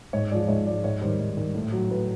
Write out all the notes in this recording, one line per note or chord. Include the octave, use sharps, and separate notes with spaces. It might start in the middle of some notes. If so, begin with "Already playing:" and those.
G#2 C#5
F3 G#3 D5
G#2 C#5
F3 G#3 D5
G#2 C#5
D#3 G3 C5
G#2
D#3 G3
A2
F#3
A2 B4